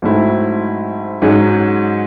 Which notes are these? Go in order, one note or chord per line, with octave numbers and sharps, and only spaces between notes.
G#2 F#3 A3 C4 E4
G#2 F#3 C#4 G#4